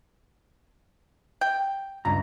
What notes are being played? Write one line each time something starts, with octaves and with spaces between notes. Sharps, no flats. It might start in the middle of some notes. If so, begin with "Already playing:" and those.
G5
C#2 G2 A#5